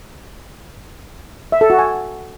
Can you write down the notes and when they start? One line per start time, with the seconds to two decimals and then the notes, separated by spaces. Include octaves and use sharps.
1.52 E5
1.61 A4
1.70 F#4
1.79 G#5